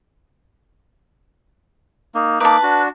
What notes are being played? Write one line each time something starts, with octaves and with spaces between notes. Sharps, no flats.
A#3 D#4
A#3 D#4 B4 A5 D6
D4 F#4